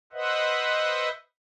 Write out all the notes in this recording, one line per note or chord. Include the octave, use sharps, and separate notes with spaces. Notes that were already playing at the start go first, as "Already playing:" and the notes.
B4 C5 D#5 E5 F#5